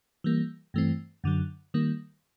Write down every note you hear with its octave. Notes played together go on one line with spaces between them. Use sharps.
E3 G3 A#3
G2 E3 A3 C4
F#2 D3 F#3
D#3 G3 A#3